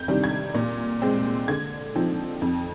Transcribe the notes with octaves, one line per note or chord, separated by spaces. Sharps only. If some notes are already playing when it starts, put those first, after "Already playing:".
Already playing: F2 G6
C3 D#3 G3 D4
G#6
A#2
G#3 C4
D3 G#6
F3 C4 D#4
F2